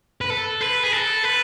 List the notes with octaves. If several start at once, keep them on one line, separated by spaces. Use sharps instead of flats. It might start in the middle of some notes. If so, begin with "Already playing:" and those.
B4
A4
B4
G#4
A4
B4